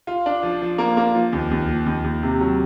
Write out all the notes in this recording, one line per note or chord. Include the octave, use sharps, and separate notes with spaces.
F4
D4
F3
F3
A#3
A#3
F3
D#2
D#2
F3
D#2
D#2
C3
F#3